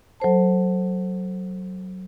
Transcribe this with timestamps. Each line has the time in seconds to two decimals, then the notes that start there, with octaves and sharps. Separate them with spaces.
0.20 F#3 A4 C5 A5